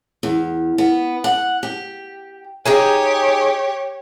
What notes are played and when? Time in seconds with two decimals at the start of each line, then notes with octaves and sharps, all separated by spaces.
0.23 E2
0.78 B3
1.24 F#5
1.63 G4
2.66 D#4 G4 G#4 C#5 G#5